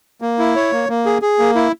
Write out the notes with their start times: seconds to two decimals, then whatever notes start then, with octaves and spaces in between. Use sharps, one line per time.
0.22 A#3
0.39 E4
0.56 C#5
0.72 A#3
0.89 A#3
1.06 G#4
1.22 G#4
1.39 A#3
1.55 E4